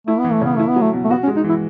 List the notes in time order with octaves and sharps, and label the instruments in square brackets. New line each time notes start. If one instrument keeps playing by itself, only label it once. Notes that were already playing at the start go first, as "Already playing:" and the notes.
[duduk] A3 [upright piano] E4
[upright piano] E3 [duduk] B3
[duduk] A3
[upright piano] C#3 [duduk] B3
[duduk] A3 [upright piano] E4
[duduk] B3
[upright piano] F#3 [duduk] A3
[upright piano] B2
[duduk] A3
[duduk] B3 [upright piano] F#4
[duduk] C#4
[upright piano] G#3
[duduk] D#4
[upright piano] E3
[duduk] E4